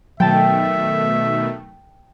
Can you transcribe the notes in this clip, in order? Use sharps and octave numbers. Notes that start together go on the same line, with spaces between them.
B2 D#3 F#3 A3 E5 G5 A5